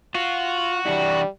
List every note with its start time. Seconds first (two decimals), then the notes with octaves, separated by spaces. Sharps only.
0.15 F4 F#4
0.86 E3 G3 D4 E4